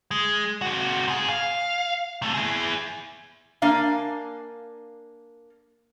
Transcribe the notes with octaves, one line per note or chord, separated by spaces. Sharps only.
G#3
C3 F#4
G#2 G#4
F5
C3 A3
E4 G#4
A#3 D4 F5 G#5